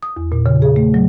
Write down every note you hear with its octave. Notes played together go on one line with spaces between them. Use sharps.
D#6
E2
A#2
C#3
G#4
A3
F#3